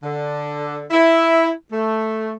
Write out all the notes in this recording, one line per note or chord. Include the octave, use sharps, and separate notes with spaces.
D3
E4
A3